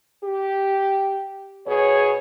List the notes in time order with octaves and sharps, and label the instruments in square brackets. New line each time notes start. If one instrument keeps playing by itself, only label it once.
[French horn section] G4
B2 G#4 C#5